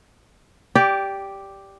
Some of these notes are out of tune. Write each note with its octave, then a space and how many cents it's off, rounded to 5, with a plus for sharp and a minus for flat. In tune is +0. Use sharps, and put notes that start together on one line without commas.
G4 +0 D5 -15